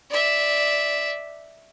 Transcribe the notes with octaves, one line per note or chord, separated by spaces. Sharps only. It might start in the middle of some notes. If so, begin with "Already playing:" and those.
D5 E5